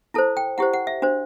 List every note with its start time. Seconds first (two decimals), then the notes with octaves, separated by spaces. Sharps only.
0.14 E4 A4 C5 A5
0.37 G5
0.58 E4 G4 C5 F#5
0.73 F#5
0.87 E5
1.02 D4 F#4 C5